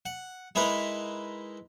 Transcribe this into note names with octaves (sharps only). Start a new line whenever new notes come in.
F#5
G#3 D#4 E4 A#4 B4